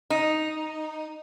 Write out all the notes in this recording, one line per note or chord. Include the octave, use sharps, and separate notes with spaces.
D#4